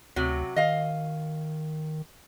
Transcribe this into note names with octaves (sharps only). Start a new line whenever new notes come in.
D2 C3 F#3
D#3 D#5 F5